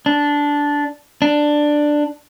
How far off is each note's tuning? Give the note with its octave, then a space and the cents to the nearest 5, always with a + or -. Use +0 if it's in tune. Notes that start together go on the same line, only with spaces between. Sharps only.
D4 -10
D4 +10